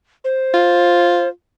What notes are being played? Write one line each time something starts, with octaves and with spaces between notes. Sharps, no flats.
C5
F4